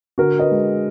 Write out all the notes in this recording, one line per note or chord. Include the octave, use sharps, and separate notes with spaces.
D3 F#4 A#4
B4 D#5
G#3